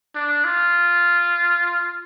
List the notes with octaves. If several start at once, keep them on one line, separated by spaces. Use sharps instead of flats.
D4
F4